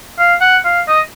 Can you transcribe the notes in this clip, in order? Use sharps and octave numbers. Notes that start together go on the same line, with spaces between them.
F5
F#5
F5
D#5